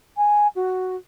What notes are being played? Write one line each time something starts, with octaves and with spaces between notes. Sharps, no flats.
G#5
F#4